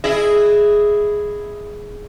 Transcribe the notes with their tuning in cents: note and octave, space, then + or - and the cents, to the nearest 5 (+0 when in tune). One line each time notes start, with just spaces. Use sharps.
E4 +0 G#4 +0 D#5 -20